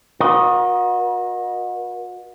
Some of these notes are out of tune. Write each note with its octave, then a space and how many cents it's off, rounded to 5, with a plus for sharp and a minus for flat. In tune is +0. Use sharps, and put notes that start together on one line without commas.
F#4 -35 A#4 +40 D#5 +0